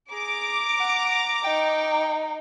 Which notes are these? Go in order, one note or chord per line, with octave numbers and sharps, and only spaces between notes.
G#4 A#5 D6
F#5
D#4 G5